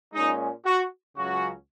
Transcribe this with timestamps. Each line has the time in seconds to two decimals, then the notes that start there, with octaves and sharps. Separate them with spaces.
0.13 A#2 G#3 C#4 D#4
0.65 F#4
1.16 C#2 C#3 F#3 C#4 F#4